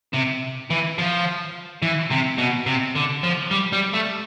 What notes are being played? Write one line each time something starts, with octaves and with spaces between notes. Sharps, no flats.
C3
E3
F3
E3
C3
B2
C3
D3
F3
G3
G3
A3